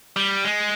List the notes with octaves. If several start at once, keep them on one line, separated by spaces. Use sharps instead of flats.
G3
G#3